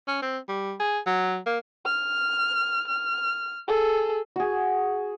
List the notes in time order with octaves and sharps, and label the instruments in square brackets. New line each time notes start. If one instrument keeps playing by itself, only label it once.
[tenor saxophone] C#4
C4
G3
G#4
F#3
A#3
[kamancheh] F6
F6
G#4 A4
[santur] F#4 G#4